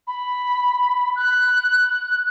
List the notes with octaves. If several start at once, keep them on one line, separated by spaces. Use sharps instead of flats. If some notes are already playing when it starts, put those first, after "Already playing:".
B5
F#6